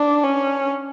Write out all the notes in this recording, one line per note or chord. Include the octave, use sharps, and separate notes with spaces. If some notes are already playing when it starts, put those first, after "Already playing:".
Already playing: D4
C#4